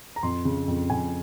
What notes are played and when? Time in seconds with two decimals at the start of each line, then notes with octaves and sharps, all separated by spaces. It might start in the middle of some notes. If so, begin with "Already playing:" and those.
0.16 A#5
0.23 F2 C6
0.45 C#3
0.68 F2
0.90 F2 G#5